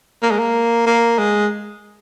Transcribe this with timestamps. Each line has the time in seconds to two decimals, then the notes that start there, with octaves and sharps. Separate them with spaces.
0.23 A#3
0.31 G#3
0.39 A#3
0.86 A#3
1.18 G#3